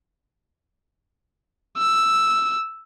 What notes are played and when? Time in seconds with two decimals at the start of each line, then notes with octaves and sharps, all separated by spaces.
1.78 E6